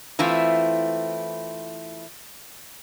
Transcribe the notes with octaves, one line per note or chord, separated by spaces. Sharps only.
E3 A3 C4 E4 F4